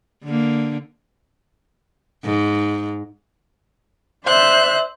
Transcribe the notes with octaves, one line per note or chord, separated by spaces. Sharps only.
D3 A#3
G#2
C5 D5 E5 F#6